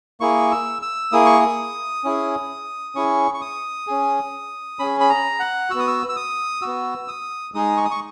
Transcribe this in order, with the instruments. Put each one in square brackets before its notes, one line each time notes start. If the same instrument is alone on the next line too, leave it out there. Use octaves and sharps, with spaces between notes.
[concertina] A#3 E4 G#4 C#6
E6
E6
A#3 E4 G#4 D#6
C#6
D#6
C#4 E4 G#4
C#4 E4 G#4 C#6
C#6
D#6
C#4 G#4
C#4 G#4 B5
B5
A#5
F#5
F#4 E6
B3 D#6
E6
E6
D#6
B3 F#4 E6
D#6
G#3 D#4 G#4 D#6
C#6
D#6
C#6